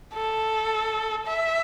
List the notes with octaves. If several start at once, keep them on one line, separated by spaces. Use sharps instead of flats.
A4
E5